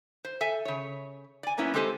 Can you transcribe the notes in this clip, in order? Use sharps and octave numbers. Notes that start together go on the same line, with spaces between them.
C5
A4 E5 G#5
C#3 C#5
D5 G#5
F#3 A#3 B3 C#4 E4
G#3 C4 G4 A4 C5 G#5